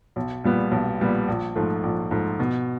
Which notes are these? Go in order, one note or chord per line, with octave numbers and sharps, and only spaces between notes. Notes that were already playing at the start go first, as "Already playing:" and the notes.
B1
A#2 G3 B3
B1
A#2 G3 B3
A#1
G#2 F3 A3
A#1
G#2 F3 A3
B2